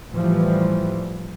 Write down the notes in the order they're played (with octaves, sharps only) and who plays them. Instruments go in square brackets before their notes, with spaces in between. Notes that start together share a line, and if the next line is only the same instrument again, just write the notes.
[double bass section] A2 E3 F3 G3